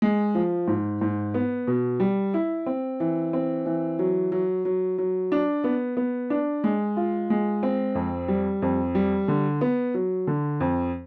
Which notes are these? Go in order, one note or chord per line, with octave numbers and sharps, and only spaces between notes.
G#3
F3
G#2
G#2
B3
B2
G3
E4
C4
E3
C4
E3
F#3
F#3
F#3
F#3
D4
B3
B3
D4
G#3
F4
G#3
C4
F2
G3
F2
G3
D3
B3
F#3
D3
F2